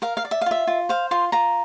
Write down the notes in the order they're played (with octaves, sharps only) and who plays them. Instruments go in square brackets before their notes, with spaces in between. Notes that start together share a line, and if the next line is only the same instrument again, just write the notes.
[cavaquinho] A#4 F5
F5
D5
E5
F5
F4 E5
F4
C5 F5
F4 C6
F4 A#5